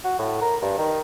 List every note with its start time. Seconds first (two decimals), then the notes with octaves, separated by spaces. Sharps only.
0.04 F#4
0.19 A2
0.42 A#4
0.62 G2
0.78 D#3